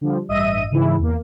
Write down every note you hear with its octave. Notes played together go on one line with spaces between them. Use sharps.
D3 F3 G3
A1 G2 D#5 E5 D#7
G#2 C#3 E3 E4
E2 A#3